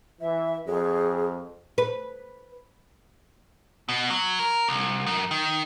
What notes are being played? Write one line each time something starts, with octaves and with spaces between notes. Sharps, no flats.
E3 E5
F2 G#4
B4
B2
F#3
A#4
C2
F#2
D#3